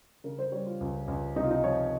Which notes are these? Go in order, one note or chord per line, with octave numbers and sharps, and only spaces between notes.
C#3 A#4
C5
G3 C#5
F4
C#2
C#2
C3 D#4
F4
D#4
F3 C#5